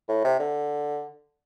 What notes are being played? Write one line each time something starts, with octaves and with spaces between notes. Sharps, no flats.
A2
C3
D3